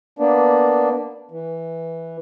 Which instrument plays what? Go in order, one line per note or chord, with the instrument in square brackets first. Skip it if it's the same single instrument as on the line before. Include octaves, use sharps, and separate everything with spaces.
[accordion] A#3 B3 D4
E3